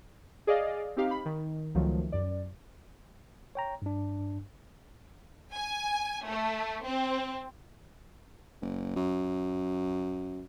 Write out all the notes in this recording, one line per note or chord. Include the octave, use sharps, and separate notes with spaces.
G#4 D5 D#5 F5
C4 D#4 G4 F5
B5
D#3
C#2 D#3 F3 F#3 A3
F#2 D5
C#5 G5 A#5
G2 D4
G#5
A3
C4
F#1
F#2